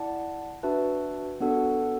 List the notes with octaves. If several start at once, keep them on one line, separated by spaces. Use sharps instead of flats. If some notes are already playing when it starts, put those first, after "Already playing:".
Already playing: E4 D5 F#5 A5
D4 F#4 B4 E5 A5
B3 D4 F#4 A4 F#5